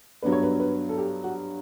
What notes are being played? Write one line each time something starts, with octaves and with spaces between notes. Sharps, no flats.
G2 F#3 B3 D4 B4
C#5
B4
B4
A4
G4
F#4